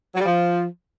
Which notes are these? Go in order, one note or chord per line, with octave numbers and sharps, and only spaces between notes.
F#3
G3
F3